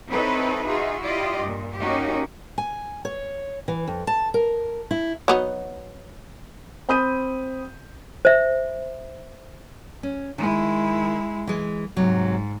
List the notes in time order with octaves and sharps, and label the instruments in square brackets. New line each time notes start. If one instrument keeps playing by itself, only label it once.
[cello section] C4 D#4 E4 A4 B4 C#5
D#4 F4 F#4 G#4 E5
E4 F4 G4 D5 D#5
G2 A#2
A#3 C#4 D#4 F#4 G4
[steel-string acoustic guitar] G#5
C#5
E3
F2
A5
A#4
E4
[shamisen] F#3 B3 D#4
[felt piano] C4 B5 D#6 G6 D#7
[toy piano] C5 E5
[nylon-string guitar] C#4
[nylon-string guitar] D#3 [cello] G#3 E4
[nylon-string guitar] E3 G#3
[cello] G#2 [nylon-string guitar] C3 F#3